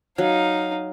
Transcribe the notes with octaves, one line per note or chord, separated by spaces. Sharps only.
F#3 D#4 F5